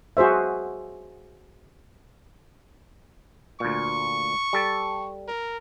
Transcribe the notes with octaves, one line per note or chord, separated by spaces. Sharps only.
F#4 G#4 C5 E5
D2 A#2 C#6
G3 A4 A5
A#4